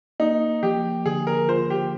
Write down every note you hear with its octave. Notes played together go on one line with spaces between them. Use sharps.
A#3 D#4
F3 G4
D3 G#4
A#4
F4 C5
G4